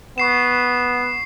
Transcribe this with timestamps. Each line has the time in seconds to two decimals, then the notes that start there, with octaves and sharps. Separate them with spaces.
0.18 B3 C#6 C7 E7